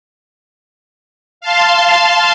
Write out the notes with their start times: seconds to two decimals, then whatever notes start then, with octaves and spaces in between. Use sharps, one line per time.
1.41 F5 A5 C6